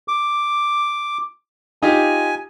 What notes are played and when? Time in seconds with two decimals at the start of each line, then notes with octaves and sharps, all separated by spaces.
0.08 D6
1.82 D#4 F4 G4 G#5